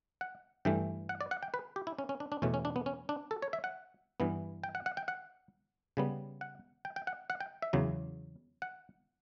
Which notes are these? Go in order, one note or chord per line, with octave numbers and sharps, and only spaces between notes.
F#5
G2 E3 A3 G5
F#5
D5
F#5
G5
B4
G4
E4
C#4
C#4
D4
D4
E2 B2 A3 C#4
C#4
D4
B3
C#4
D4
A4
C#5
E5
F#5
G2 E3 B3
G5
F#5
F#5
G5
F#5
C#3 G3 B3
F#5
G5
G5
F#5
F#5
G5
E5
E2 C#3 F#3
F#5